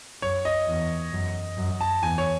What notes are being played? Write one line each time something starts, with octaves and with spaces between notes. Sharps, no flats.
F#2 C#5
D#5
E2
F#2
F#2
A5
E2 G#5
C#5